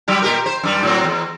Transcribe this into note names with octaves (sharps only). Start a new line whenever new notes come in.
F#3 G3 G4
A#2 G4 A#4
C5
F#2 G3
A2 F#3 C4
E2